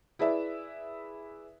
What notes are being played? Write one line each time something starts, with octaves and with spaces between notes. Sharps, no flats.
E4 G#4 B4 D5 E5